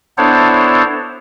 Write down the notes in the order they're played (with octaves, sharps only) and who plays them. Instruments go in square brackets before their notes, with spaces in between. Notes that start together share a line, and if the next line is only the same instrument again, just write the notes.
[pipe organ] B3 D4 E4 A4 C5 C#5